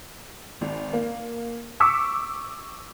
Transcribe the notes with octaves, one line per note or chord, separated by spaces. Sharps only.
G#1
A#3
C#6 D6 E6 B6 C#7